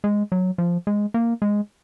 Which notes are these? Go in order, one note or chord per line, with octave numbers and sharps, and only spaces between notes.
G#3
F#3
F3
G#3
A#3
G#3